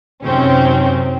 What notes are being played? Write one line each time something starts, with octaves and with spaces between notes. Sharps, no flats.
F#2 C3 D#3 C4 C#4